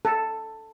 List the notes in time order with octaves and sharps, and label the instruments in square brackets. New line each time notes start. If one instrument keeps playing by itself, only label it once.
[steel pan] A4